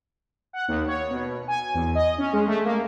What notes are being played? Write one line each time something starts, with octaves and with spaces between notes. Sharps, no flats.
F#5
D#2
C#5
B2
G#5
E2
D#5
C#4
G#3
A3
A#3